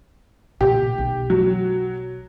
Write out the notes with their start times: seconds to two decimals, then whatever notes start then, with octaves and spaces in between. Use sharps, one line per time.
0.61 A#2 C#3 G4
0.98 B1
1.30 F#3